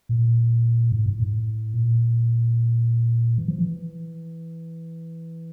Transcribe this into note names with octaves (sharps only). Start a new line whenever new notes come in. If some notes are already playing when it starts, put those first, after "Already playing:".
A#2
A2
G#2
A2
A#2
E3
F3
E3